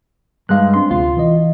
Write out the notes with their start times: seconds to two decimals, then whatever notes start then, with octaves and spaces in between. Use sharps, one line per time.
0.49 G2 G#3 F5 F#6
0.74 C4 D4 C6
0.91 D2 C3 F4
1.17 E3 D#5